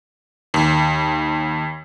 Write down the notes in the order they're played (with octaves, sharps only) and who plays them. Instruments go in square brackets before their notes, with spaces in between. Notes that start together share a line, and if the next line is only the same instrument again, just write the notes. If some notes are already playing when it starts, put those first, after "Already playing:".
[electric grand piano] D#2